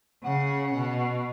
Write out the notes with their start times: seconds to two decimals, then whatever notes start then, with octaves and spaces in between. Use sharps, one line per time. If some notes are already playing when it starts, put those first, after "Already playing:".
0.24 C#3 F#5
0.75 B2